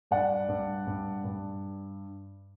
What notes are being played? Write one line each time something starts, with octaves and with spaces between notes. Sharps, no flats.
G2 D5 F#5
G2
G2
G2